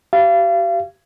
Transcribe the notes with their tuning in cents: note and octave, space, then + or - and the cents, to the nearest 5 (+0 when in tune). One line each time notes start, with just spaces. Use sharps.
G4 -35 F5 -35